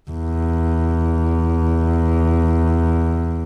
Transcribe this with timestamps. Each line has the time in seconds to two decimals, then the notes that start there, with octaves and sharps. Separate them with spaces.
0.11 E2